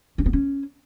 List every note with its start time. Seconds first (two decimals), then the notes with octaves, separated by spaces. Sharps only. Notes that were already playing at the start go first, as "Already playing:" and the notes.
0.18 C#4
0.26 B3
0.33 C#4